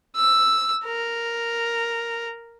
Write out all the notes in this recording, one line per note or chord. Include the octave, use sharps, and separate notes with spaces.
E6
A#4